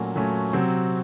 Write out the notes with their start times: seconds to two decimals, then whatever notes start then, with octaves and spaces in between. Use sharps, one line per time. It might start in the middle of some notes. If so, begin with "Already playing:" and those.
Already playing: A#2 F#3 A3 C#4 F#4
0.16 A#2 F#3 A3 C#4 F#4
0.53 C3 F#3 C4 F#4